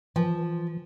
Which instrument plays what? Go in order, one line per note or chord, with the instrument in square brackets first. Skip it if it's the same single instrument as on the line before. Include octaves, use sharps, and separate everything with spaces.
[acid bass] E3 [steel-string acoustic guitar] F3